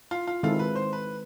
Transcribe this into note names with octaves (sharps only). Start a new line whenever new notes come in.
F4
F4
D#3 G#3 C4 E4 F4 A4
B4
C5
B4